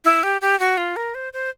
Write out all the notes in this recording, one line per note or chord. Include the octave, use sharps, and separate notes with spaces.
E4
G4
G4
F#4
F4
A#4
C5
C5